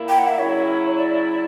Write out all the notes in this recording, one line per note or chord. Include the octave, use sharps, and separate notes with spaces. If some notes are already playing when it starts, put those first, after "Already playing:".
Already playing: A#2 A#3 E4
G5
F#5
E5
C#3 F#3 C#4 E4 C#5
D5